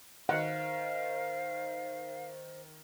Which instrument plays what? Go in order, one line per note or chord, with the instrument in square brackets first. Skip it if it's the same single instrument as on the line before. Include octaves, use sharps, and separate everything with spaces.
[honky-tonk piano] D#3 [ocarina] C5 [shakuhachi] F5 [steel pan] F#5